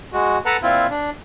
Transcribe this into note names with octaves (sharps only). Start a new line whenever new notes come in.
G#3 F#4
A4 B4 F#5 A5 A#5
A#2 C4 E4 F4
D4